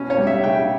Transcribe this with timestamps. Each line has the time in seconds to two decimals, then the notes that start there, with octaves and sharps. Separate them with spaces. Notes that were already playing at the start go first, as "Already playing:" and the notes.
Already playing: B2 C#4
0.10 C#5
0.18 G3
0.27 E5
0.44 C#3 G5